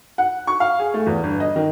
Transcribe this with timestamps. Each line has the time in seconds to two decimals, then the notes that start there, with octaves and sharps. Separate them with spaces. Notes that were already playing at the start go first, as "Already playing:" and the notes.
0.18 F#5
0.47 C#6
0.60 F5
0.80 G#4
0.94 A3
1.07 E2
1.23 G1
1.40 D#5
1.56 D#3